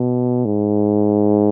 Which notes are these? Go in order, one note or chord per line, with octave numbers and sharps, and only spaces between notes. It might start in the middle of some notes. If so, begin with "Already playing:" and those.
Already playing: B2
G#2